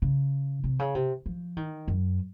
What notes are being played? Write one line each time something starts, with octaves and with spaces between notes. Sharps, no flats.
C#3
C3
C#3
C3
F3
D#3
F#2